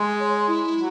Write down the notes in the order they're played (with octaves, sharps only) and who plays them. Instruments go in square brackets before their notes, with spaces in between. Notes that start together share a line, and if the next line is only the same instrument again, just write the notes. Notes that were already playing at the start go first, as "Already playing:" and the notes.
Already playing: [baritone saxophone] G#3
[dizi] C#5
E4
[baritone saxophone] F#3